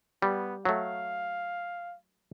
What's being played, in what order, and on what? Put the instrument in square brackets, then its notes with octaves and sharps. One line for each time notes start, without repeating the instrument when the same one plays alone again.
[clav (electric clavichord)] G3 [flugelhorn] B3
[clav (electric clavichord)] F#3 A3 [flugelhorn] F5